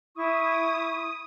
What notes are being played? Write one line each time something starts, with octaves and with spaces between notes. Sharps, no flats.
E4 C#6 D#6